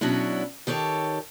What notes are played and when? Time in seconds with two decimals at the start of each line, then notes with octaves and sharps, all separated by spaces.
0.01 B2 F#3 C#4 D4 E4
0.67 D#3 G4 A4 C#5